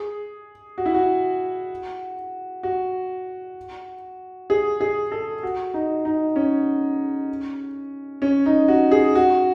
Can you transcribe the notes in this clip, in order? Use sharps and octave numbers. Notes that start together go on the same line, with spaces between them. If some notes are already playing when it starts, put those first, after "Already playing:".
Already playing: G#4
F#4
E4
F#4
F#4
G#4
G#4
A4
F#4
D#4
D#4
C#4
C#4
D#4
F#4
G#4
F#4